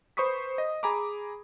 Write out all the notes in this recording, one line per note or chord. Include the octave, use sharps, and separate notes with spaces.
B4 C5 B5 C#6 D#6 B6
D#5
G#4 G#5 A#5 B5 D6